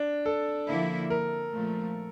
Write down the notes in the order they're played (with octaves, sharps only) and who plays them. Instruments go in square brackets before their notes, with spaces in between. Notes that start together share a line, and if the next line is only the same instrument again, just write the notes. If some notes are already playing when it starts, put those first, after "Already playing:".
Already playing: [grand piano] D4
A4
[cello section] D3 F3 A#3 E4
[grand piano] A#4
[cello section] A#2 F3 A3